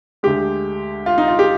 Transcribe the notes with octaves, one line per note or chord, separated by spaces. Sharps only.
D2 D3 G#3 G4
F4
D#4
F4
G4